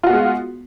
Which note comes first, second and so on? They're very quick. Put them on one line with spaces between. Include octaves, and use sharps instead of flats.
F4 F#4 B3 G#3